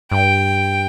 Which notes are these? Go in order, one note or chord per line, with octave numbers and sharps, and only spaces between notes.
G2 G5